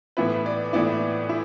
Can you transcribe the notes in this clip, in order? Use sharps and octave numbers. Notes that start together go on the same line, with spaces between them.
A2 E3 B3 E4 B4
D5
A2 E3 B3 E4 D5
E4